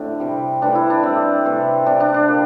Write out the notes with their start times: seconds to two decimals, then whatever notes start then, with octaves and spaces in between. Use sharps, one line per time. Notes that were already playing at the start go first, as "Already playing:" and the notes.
Already playing: A2 D3 A3 C4 D4
0.20 C3 G3
0.62 A2 E3 G3 D4
0.75 E4
0.90 D4
1.03 A2 G3 C4
1.45 C3 E3 A3
1.86 C3 G3 D4
2.00 D4
2.14 D4
2.28 A#2 G3